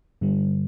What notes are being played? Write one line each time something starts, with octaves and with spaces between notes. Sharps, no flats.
G2 D3 G3